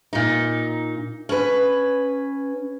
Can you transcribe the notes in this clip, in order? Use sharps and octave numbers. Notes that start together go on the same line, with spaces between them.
A#2 D#4
C#4 B4